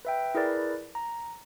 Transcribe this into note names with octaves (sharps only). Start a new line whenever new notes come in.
B4 E5 G5
E4 G#4 A#4 B4 D5
A#5